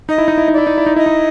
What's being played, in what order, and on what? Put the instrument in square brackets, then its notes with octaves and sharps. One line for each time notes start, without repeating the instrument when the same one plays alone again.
[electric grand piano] D#4 [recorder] D#5
[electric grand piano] E4
D#4
E4
D#4
[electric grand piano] E4 [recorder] D5
[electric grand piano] D#4
E4
D#4
[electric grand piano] E4 [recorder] D#5
[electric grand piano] D#4